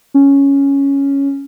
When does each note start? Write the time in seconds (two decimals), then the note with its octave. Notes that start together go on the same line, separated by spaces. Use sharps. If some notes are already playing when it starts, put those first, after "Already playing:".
0.14 C#4